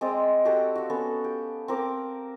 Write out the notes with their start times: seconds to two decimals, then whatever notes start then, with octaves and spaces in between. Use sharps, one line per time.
0.01 G#3 C4 D5 D#6
0.45 F#4 G4 A4 F#5
0.76 F#4 F5
0.90 B3 C#4 A4
1.24 G4
1.68 C4 A#4 D6